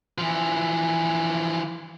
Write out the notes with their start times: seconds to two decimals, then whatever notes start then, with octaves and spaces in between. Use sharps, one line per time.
0.18 E3 F3